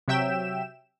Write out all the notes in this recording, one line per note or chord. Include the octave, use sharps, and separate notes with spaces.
C3 F#3 E5 G5 E7